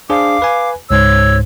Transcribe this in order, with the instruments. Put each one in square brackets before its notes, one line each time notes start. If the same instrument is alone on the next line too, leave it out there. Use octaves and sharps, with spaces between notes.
[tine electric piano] D4 G#4 C5 [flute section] F5 D6
[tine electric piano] B4 G#5
[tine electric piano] C#2 G#2 C5 [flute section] C#5 E6